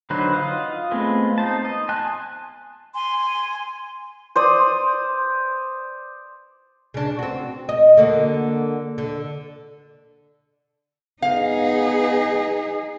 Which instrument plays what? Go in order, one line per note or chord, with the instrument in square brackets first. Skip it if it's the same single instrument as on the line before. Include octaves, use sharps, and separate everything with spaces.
[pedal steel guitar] D3 F#3 D#4 B4 C5
F4 D#5 F5 F#5
G#3 A3 B3 C4 F4
D#4 C5 A5
D#5
G#5 A5 C6 F#6
[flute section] G#5 C6
[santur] C5 D5 D#6
[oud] C#3 D4
C4 F#4
D#5
D3 A#3 F#4
D3
[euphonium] B3 [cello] D#4 G#4 [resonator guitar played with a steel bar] F5